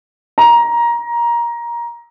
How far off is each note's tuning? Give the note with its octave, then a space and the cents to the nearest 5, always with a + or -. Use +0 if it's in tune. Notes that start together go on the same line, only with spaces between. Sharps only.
A#5 +15